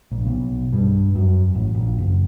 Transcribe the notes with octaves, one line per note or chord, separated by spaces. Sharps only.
A#1
B1
G2
F#2
A1
A#1
F#1